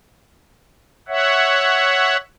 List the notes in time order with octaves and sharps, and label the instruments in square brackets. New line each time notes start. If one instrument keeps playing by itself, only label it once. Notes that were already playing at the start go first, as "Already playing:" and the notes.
[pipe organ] C#5 E5 F#5